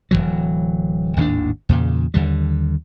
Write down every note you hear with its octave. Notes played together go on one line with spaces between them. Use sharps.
D1 E2 E3 F#3
G#1 D#2 A2 D4
E2 A#2 C#3
D#2 D3 G3